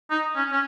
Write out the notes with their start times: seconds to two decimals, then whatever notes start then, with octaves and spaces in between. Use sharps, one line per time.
0.10 D#4
0.35 C#4
0.52 C#4